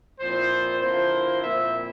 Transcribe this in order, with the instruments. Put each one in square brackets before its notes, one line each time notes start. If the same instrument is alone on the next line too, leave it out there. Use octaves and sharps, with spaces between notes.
[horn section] A#2 F3 C4 E4 C5
D3 F3 A#3 E4 C5
A#2 F3 C4 E4 E5